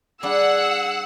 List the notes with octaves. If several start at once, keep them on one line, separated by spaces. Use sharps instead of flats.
G3 D4 G#4 F#5 E6